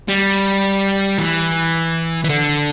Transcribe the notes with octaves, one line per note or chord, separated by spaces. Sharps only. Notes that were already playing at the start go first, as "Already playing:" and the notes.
G3
E3
E3
D3